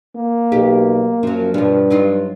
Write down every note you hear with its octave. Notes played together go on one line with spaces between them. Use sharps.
A#3
B1 G4
F#2 F3 F#3
G2 B2 F3
F#3 D#4 F4